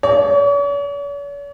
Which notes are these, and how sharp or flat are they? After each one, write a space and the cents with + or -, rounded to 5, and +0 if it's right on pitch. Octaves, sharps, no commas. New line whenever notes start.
C#5 +45